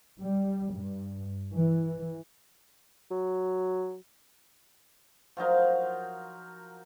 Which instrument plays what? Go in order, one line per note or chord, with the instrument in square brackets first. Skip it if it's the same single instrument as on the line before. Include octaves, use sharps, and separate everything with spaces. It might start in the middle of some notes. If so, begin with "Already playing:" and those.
[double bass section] G3
G2
E3
[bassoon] F#3
[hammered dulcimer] F3 F#3 D#4 A#4